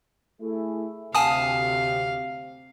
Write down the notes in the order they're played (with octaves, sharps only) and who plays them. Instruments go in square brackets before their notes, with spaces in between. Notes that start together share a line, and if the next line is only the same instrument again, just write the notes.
[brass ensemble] A3 E4 G#4
[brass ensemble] D2 C3 [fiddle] F5 [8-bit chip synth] G#5 A5 D#6